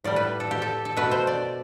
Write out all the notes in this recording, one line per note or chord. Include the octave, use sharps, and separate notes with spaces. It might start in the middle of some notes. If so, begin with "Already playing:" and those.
A2 G3 D5
B4
A4
G4
A4
A4
B2 A3 B4
C5
D5